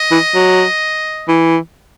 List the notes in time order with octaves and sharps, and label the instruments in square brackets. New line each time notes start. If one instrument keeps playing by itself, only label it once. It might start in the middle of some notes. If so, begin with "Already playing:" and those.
Already playing: [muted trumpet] D#5
[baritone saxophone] E3
F#3
E3